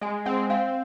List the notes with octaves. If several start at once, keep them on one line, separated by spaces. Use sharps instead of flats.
G#3 G#5
C4 F#5
C4 F5